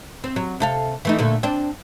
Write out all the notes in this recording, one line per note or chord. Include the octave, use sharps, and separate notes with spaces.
C4
F#3
C3 A4 F5
E3 A3 D#4
A#2 D3 A3
C4 D4